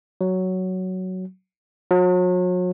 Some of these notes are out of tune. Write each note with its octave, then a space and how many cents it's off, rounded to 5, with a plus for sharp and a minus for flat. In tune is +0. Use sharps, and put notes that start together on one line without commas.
F#3 +5
F#3 -40